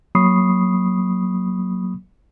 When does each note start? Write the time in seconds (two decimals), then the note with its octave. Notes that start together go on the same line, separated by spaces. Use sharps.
0.15 F#3 A#3 B5 C#6 D#6 C7